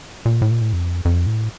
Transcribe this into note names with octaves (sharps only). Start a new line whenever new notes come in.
A#2
A2
A#2
A2
F2
F2
A2